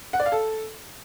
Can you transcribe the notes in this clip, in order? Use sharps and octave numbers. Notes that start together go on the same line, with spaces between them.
F#5
D5
F5
A4